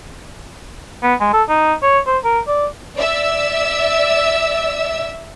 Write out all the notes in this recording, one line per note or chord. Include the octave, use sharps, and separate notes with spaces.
B3
G#3
A4
D#4
C#5
C5
A#4
D5
D5 E5 E6